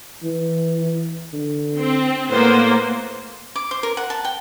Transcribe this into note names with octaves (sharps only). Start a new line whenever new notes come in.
E3
D3
C4
A2 A#3 B3 C5
D6
C5
A#4
F#5
A5
G5